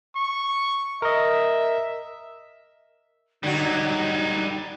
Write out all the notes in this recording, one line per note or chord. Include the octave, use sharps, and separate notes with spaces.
C#6
A#4 D#5 E5
D3 F#3 G3 D#4 F#4